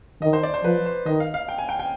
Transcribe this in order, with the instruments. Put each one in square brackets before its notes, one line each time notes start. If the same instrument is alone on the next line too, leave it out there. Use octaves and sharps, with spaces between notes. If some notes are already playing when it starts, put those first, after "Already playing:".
[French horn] D#3 [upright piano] D#5
[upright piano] C5
D5
C5
[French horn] F3 [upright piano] B4
[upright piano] C5
[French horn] D#3 [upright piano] D#5
[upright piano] F5
F5
G5
G#5
G5
G5